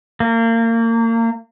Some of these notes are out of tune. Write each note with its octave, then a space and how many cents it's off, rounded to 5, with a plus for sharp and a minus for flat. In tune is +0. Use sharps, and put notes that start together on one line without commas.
A#3 -30